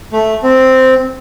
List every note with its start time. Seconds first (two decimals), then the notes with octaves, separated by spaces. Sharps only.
0.12 A3
0.43 C4